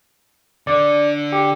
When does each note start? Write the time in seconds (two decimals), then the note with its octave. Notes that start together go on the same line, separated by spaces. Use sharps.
0.67 D3 D5
1.32 G4